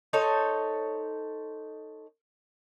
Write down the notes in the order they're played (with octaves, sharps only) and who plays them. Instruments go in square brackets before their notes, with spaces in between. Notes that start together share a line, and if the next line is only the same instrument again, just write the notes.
[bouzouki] D#4 A4 C5 C#5